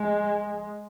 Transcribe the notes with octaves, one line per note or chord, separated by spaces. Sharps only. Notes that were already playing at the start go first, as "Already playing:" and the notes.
Already playing: G#3